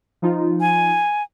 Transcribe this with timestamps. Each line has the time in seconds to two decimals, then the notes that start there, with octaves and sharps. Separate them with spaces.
0.22 F3 D#4 F4
0.61 G#5